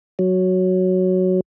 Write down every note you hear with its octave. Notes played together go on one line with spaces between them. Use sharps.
F#3